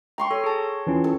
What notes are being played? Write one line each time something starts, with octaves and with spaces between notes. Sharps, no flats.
G5 A#5 C6 C#6
A4 C#5
G#4 A5
E3 C#4 F4
A4